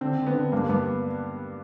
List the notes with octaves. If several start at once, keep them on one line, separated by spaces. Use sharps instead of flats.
D3 C4
D3
B3
D3
G2 A#3
G2 B3